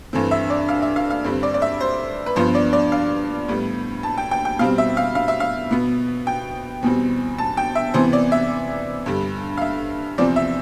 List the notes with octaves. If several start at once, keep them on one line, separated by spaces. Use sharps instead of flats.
G2 E3 A3 C4
E5
D5
F5
E5
F5
F5
G2 D3 G3 C4
D5
D5
E5
C5
B4
G2 F3 B3 C5
D5
D5
F5
A2 G3 B3
A5
G5
G5
G5
B2 G3 C4 F5
E5
F5
F5
E5
F5
B2 B3
G5
E2 B2 G3 C4
A5
G5
E5
C3 E3 B3 C5
D5
E5
G2 D3 G3
F5
E5
E2 C3 F3 C4 D5
E5